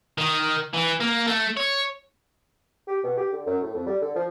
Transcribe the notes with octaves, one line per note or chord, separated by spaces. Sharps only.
D#3
E3
A#3
A3
C#5
G4
B2
G4
D3
F#2
A2
F2
G3
D3
F3